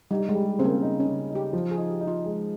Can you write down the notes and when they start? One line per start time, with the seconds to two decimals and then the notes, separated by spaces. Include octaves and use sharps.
0.11 G3 D#4
0.29 G#3
0.35 G3
0.59 C#3 C4
0.64 A#3
0.83 D#4
1.00 C#4
1.06 C#3
1.30 D#4
1.35 G4
1.53 F3
1.71 G#4
1.78 D#4
1.90 G4
2.01 D#4
2.08 F4
2.26 G#3